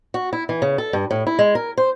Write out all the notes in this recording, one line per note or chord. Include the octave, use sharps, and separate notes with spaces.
F#4
E4
E3
C#3
A4
G2
A2
E4
G#3
A#4
C5